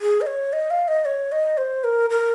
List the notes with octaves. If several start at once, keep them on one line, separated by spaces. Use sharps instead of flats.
G#4
D#5
C#5
D#5
F5
D#5
C#5
D#5
C5
A#4
A#4